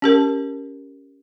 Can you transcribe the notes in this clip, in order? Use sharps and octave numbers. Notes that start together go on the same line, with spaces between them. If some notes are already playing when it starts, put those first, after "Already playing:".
C#4 G4 A#4